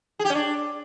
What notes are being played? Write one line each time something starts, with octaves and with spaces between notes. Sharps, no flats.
G#4
G4
C#4
D4